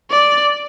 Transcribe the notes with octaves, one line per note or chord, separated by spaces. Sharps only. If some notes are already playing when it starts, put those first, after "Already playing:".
D5